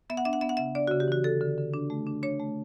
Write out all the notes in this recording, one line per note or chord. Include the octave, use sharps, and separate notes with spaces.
B3 E5
F#5
D4 E5
F#5
B3 E5
F#5
C#3 E5
D4 D5
C#3 F#4
G4
E3 F#4
D3 A4
D3
D3
D4
A3
D4
D4 C#5
A3